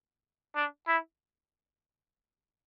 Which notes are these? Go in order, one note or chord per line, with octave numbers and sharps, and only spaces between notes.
D4
E4